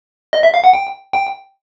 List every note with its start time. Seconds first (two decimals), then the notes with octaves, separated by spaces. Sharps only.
0.33 D#5
0.43 E5
0.54 F5
0.64 F#5
0.74 G5
1.13 G5